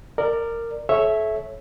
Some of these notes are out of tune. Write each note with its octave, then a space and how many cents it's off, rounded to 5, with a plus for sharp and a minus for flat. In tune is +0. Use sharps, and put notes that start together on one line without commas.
A#4 -15 D5 +15
A4 -35 C#5 -10 E5 +0